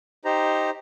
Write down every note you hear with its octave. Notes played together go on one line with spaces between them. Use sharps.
D#4 G4 C5 A#5